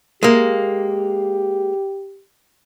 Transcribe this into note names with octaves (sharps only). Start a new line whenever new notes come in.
G#3 A#3 G4